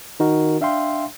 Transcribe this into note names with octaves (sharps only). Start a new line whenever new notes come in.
D#3 D#4 F#4 A#4
D4 E5 F5 G5 C6